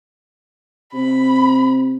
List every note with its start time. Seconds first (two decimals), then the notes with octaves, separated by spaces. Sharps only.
0.93 C3 B5